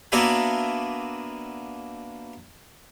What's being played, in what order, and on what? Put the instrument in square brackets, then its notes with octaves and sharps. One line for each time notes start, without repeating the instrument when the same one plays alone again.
[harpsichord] A#3 B3 D4 F#4 E5 G#5